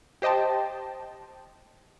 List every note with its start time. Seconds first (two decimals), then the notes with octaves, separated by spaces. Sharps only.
0.22 G4 C5 D#5 G5 A5